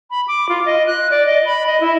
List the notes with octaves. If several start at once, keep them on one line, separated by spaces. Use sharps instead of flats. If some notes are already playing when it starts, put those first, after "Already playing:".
B5
D6
F4
D#5
F#6
D5
D#5
B5
D#5
E4